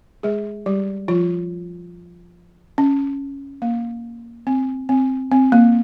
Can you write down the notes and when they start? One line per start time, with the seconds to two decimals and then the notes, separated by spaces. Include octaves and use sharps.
0.23 G#3 G#4
0.66 G3 G4
1.08 F3 F4
2.78 C#4
3.62 A#3
4.47 C4
4.89 C4
5.31 C4
5.52 A#3